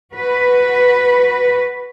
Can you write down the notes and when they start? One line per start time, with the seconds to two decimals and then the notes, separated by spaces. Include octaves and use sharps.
0.13 F#4 B4